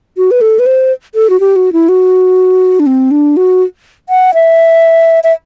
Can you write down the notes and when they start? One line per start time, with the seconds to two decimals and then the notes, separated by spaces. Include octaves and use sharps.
0.17 F#4
0.31 B4
0.41 A4
0.59 B4
0.66 C5
1.15 A4
1.30 F#4
1.40 G4
1.56 F#4
1.73 E4
1.89 F#4
2.80 D4
2.86 C4
3.11 D4
3.37 F#4
4.09 F#5
4.34 E5
5.24 E5